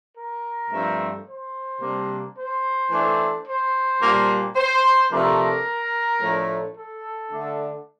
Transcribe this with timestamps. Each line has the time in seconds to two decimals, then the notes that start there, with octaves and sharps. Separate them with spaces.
0.16 A#4
0.71 G2 F3 A3 C4
1.26 C5
1.80 C3 G3 A#3 D4
2.35 C5
2.91 E3 A3 D4
3.46 C5
4.01 A#2 G3 A#3 D4
4.56 C5
5.11 C3 F3 A3 D4 A#4
6.21 A2 F3 A3 D4
6.76 A4
7.31 D3 A3 D4